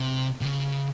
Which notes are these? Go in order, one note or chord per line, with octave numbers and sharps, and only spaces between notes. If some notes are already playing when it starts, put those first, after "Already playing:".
Already playing: C3
C3
C#3